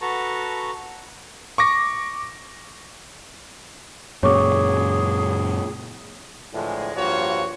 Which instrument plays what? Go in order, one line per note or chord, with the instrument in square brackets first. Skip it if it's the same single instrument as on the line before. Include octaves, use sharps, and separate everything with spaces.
[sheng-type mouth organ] F#4 A4 B4 A5 A#5 C#6
[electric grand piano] C#6 D6 A#6
[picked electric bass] F#2 A#2 C#3 [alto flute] G#4 [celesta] C#5 C#6 D6
[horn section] A2 D3 E3 F3 G#3
G2 F3 A#3 F4 F#4 C#5